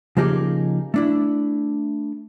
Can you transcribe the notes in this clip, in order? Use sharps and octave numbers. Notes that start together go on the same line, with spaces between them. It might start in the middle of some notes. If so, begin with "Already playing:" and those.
C#3 F3 A#3 D#4 G4 G#4
A3 D4 E4